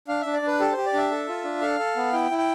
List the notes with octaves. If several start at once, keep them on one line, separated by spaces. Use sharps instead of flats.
D4 F5
D4 E5
D5
D4 B4
G4 A4
G4 C5
D5
D4 E5
A4
F4
D4
A4 F5
A4
B3
E4 G5
E4
G5